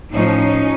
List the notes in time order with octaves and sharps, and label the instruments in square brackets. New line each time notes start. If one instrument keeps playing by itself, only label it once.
[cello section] A2 F3 C#4 D#4